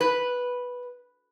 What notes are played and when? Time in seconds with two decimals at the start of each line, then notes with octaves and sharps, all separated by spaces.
0.01 B4